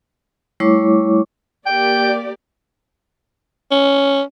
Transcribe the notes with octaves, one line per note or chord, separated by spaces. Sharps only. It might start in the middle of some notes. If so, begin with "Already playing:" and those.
G3 A3 E4 C#5 C#6 D6
A#3 G4 D5 G5
C#4